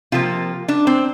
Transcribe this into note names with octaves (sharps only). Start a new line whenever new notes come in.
C3 F3 A#3 F4
D4
C4